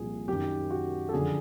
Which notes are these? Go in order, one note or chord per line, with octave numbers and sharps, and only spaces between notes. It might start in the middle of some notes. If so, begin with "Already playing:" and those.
Already playing: C2 A#2 F3 G#4
F#2 D#3 G4
F#4
A4
F#2 D3 F3 G#4